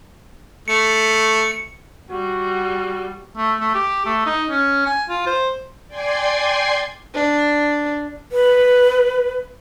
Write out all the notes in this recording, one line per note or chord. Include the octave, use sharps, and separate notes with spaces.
A3 C#7
G3 F#4
A3
A3
G4
A3
D#4
C#4
G#5
F4
C5
D5 G5 G#5 C6 G#6 C7
D4
B4